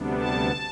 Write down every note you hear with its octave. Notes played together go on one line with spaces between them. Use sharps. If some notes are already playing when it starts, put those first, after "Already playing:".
Already playing: D2 C3 G3 B3 D4
A5